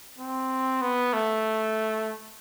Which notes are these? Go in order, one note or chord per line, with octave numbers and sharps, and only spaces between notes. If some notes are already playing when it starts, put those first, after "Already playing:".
C4
B3
A3